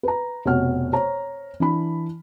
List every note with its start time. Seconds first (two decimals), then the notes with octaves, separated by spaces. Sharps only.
0.03 B4 A#5
0.45 F1 B2 C#5 F#5 F6
0.93 C5 C#5 A#5
1.60 E3 D4 B5